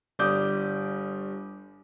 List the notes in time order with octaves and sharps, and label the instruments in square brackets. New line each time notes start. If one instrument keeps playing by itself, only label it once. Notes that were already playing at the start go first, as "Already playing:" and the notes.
[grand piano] G1 G3 D6 D#6 G6